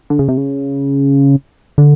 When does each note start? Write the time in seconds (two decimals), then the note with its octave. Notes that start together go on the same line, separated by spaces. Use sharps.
0.10 D3
0.19 C#3
0.28 C3
0.37 C#3
1.78 D3